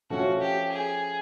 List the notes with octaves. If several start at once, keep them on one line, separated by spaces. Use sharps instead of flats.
F3 A3 C#4 F#4
G4
G#4